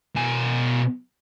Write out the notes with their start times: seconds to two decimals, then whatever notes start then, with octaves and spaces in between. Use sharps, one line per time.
0.16 B2 G#5